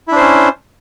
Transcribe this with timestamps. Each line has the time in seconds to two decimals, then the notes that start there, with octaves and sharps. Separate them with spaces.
0.08 E4
0.12 D4
0.16 C5
0.20 C#4